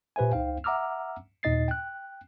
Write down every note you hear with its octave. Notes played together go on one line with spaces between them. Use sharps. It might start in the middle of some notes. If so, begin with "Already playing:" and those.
A#2 G4 B4 C5 E5 G#5
C#2 D#4 C5 F5 G5
E5 F#5 A#5 D6 E6 F6
D#2 A#2 D#4 D#5 A6 C7
G5 F#6